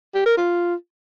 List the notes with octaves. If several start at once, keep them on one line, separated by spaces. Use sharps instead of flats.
G4
A#4
F4